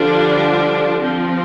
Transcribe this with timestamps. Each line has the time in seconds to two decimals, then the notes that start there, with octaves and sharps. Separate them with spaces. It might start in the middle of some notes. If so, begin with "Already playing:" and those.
Already playing: D3 F3 G3 D4 F4
1.00 F3 C4